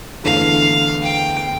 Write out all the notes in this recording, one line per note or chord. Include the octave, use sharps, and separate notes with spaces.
E2 D3 A3 E4 F5
G5